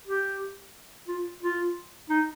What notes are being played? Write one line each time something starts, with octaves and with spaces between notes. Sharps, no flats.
G4
F4
F4
D#4